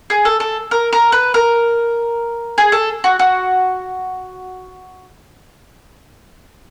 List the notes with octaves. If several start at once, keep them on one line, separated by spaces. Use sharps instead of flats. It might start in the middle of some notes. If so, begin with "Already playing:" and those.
G#4
A4
A4
A#4
A#4
B4
A#4
G#4
A4
F#4
F#4